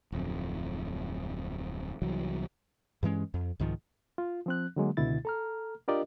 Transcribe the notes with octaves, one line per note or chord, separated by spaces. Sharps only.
D1 F2
C2 E3 F#3
G2 E3 G#3 C#4
F2
C2 G#2 D#3 F3
F4
F3 C4 F#6
D3 F#3 G#3 A#3
C#2 B2 D3 E4 A6
A4 A#5 F6
D4 F4 G4 A#4 D5 D#5